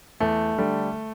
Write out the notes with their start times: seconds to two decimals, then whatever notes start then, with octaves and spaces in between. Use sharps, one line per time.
0.20 E2 A3
0.58 D3 G3